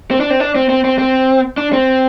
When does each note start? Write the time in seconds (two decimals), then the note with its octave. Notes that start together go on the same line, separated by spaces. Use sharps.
0.11 C4
0.20 D4
0.30 C4
0.40 D4
0.56 C4
0.69 C4
0.84 C4
0.99 C4
1.57 D4
1.73 C4